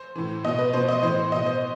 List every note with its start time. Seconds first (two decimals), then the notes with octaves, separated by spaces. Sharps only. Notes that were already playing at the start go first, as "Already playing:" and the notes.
Already playing: C5
0.16 A2 E3
0.44 B2 D#5
0.59 B4
0.73 B2 C5
0.89 D#5
1.03 A2 E3 C5
1.32 B2 D#5
1.46 C5